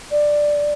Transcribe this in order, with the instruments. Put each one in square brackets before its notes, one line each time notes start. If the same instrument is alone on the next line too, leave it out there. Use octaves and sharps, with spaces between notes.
[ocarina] D5